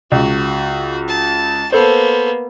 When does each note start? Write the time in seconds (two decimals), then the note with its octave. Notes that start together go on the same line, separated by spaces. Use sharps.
0.12 C#2 F#4
1.08 A5
1.72 A#3 B3 A4 C5